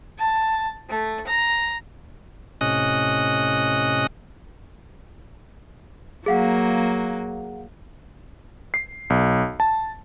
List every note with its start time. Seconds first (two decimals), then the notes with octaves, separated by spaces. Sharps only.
0.18 A5
0.89 A3
1.27 A#5
2.61 A2 C3 C#4 D#5 D#6 F#6
6.26 F#3 A#3 G#4 F5 F#5
8.74 C7
9.10 B1
9.60 A5